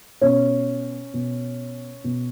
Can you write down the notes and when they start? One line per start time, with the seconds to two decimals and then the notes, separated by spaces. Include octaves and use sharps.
0.21 B2 C#4
1.14 B2
2.04 B2